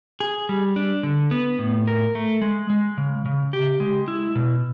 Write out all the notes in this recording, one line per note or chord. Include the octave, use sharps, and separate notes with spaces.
G#4
G3
D4
D3
B3
A2
A#4
A3
G#3
G#3
C#3
C#3
G4
G#3
E4
B2